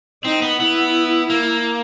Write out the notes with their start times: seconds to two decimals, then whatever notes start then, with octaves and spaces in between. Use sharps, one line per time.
0.24 C4 D#4
0.42 B3
0.60 B3 E4
1.30 A#3